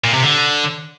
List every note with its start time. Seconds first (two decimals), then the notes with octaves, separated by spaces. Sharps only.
0.04 A#2
0.14 C3
0.23 D3